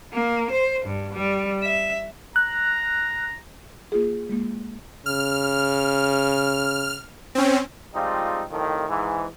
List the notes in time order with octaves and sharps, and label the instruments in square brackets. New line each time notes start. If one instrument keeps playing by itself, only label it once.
[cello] A#3
C5
G2
G3
E5
[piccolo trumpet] A#5 [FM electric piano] F#6
[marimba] A#3 F4 G#4
G#3 A#3
[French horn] C#3 [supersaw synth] F6
[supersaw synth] C4 C#4
[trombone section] F3 G3 G#3 C4 D#4 F4
C2 F2 A2 D#3
G#2 E3